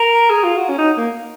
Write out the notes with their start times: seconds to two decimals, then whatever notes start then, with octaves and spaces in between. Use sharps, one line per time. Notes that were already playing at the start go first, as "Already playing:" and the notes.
Already playing: A#4
0.30 G#4
0.44 F4
0.56 F#4
0.69 C#4
0.78 D#4
0.97 A#3